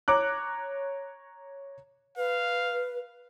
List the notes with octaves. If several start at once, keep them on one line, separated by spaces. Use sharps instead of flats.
C#5 A#5 D6 F#6
B4 F5